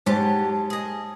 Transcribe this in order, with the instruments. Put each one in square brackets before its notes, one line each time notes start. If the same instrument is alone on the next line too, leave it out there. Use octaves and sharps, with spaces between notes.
[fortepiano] G#2 [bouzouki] F#3 G4 A5
[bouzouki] G#4 D#5